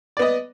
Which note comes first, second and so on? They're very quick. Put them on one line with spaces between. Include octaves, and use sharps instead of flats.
D5 B3 D#5